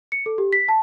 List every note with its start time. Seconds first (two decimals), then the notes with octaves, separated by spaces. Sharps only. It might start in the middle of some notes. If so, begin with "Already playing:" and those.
0.12 C#7
0.26 A4
0.38 G4
0.53 B6
0.68 A5